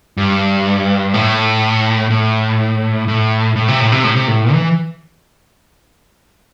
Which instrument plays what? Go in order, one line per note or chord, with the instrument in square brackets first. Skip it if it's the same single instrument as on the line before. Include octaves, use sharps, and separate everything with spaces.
[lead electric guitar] G2
A2
A2
A2
A2
C3
A2
C3
A2
C3
A2
E3